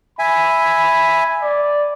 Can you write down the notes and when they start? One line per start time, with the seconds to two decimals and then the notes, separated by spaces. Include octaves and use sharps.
0.19 E5 G#5 B5
1.42 D5